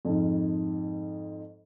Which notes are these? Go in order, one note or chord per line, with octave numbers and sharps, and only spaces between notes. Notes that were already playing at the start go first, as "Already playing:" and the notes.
F2 G#2